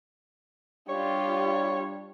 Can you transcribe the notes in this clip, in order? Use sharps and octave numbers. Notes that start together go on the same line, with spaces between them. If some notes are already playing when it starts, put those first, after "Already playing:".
G3 D4 F4 G4 C#5